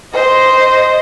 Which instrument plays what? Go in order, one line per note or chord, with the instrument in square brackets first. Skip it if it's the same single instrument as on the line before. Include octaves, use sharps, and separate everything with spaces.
[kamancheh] C5 D#5